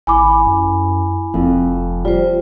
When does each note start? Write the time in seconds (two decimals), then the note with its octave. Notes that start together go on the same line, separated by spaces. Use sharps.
0.07 G#1 E4 G#5 B5 D6
0.46 F#2
1.34 F1 F2
2.05 G3 F4 C5